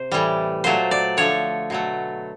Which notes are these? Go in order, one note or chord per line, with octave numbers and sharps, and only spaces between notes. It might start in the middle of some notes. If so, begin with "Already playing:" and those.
Already playing: C3 C5
A2 E3 G3
A#2 F#3 A3 C5
D5
D3 F3 A3 C#5
B2 F#3 A3